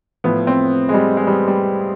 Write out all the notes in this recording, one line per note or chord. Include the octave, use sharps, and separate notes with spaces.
A2 F3 B3
C4
G#3
G3
G#3
G3
G3